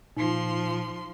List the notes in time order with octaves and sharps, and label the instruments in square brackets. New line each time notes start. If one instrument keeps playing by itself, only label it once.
[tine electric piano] A#2 [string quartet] F3 C6 [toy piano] D#4